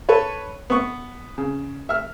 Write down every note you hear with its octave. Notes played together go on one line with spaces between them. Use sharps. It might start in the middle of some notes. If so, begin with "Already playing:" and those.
A4 B4 C#5
B3 C#6
C#3
E5 F6